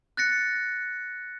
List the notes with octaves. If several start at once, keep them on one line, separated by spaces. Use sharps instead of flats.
F#6 A6 A#6 C#7